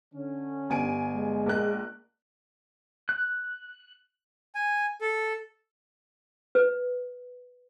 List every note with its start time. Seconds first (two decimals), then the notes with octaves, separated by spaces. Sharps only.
0.14 D3 C#4
0.70 G1 G#5 D7
1.14 G#3
1.46 A#1 A#4 F#6
3.09 F#6
4.55 G#5
5.01 A4
6.55 B4